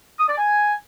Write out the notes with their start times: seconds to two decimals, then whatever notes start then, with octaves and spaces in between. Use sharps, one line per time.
0.19 D#6
0.28 D5
0.37 G#5